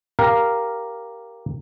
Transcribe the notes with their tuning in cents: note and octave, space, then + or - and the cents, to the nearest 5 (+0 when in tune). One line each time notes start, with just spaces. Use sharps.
G4 +0 A#4 +0 F5 +0